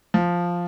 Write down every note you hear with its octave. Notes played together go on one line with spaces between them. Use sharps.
F3